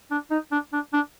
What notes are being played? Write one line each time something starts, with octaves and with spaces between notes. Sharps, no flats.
D4
D#4
D4
D4
D4